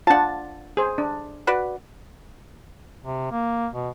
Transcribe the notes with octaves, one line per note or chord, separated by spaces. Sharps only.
D4 F4 F#5 A5
G#4 C5
D4
F#4 B4 D5
C3
A#3
B2